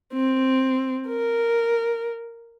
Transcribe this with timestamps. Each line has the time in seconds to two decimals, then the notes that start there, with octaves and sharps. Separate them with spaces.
0.14 C4
1.08 A#4